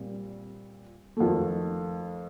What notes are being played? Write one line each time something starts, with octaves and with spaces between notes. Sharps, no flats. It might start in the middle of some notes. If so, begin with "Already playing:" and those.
Already playing: A#2 G3 C4
F2 D#3 A3